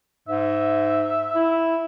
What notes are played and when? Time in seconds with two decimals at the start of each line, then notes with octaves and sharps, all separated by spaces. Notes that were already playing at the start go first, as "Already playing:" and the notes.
0.28 G#2 E5
1.35 E4